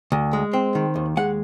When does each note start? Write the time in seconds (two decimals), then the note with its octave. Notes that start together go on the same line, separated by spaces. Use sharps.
0.12 D2
0.33 G#3
0.53 C4
0.75 D#3
0.96 D#2
1.17 G#3 F#5